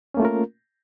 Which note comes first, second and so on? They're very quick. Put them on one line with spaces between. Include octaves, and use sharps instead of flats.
C#4 A#3 A3 F4 A#4